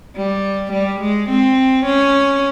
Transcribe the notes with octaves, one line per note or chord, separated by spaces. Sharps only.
G3
G3
G#3
C4
C#4